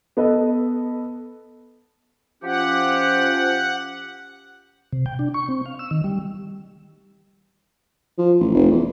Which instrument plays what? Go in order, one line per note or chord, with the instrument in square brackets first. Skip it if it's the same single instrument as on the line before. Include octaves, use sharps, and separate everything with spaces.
[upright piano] B3 A4 B4 D#5
[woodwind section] F3 C#4 G4 [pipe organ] F#5
[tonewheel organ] C3
G5
D4
C#6
C4
F5
E6
D#3
G3
[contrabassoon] F3
A1
F1
E2